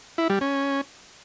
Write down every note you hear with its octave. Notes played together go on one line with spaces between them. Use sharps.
E4
G3
C#4